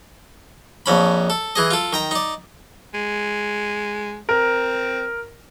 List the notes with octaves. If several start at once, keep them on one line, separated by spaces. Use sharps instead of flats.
A#1 F2 C#4 B5
A4
E3 G#4 D#5
F4 A4
D#3 G5 A#5
D#4 D5
G#3
C4 A#4